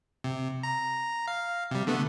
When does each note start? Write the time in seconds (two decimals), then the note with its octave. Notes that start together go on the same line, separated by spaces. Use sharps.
0.24 C3
0.63 A#5
1.28 F5
1.71 C3 G3
1.87 D3 A3 B3